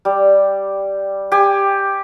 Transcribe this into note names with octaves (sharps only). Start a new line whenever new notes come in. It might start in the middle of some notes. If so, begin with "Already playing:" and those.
G3
G4 G#5